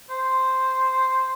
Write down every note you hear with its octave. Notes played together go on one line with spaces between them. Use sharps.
C5